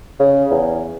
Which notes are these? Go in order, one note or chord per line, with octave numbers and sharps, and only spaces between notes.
C#3
E2